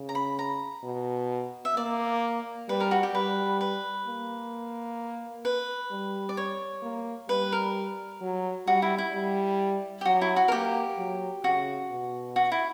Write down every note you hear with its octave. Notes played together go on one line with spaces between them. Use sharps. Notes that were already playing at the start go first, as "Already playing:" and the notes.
Already playing: C#3
A#5
B5
A#5
B2
E5
A#3 D5
G3 B4
A#4
F#4
G4
G3 B4
B4
A#3
B4
G3
D5
C#5
A#3
G3 B4
A#4
F#3
G3 F#4
E4
E4
G3
G4
F#3 F#4
E4
F#4
A#4
A#3 G4
F#3
C#3 F#4
B2
F#4
E4